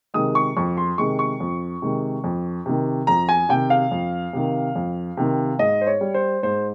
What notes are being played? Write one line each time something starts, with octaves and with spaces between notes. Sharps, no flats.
C3 D#3 G#3 D#6
C#6
F2 C#6
C6
C3 D#3 G#3 C#6
C#6
F2
C3 D#3 G#3
F2
C3 D#3
F2 A#5
G#5
C3 D#3 G5
F5
F2
C3 D#3
F2
C3 D#3
G#2 D#5
C5
C#5
G3
C5
G#2 C5